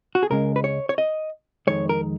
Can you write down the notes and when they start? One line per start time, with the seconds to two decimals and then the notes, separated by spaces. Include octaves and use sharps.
0.15 F#4
0.23 G#4
0.30 C#2 C#3 G#3 A#4
0.56 B4
0.64 C#5
0.89 C#5
0.98 D#5
1.67 F2 D#3 G#3 C#5
1.89 A#4